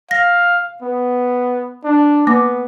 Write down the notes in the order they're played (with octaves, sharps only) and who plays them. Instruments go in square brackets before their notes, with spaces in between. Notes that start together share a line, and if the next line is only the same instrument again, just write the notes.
[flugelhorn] F5 [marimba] A#6
[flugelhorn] B3
D4
[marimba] A#3 D6 [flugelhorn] B3